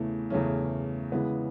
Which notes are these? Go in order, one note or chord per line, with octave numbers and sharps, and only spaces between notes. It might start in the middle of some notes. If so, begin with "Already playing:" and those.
Already playing: E2 C#3 E3 A3
E2 C#3 E3 A3 C#4
C#3 E3 G#3 B3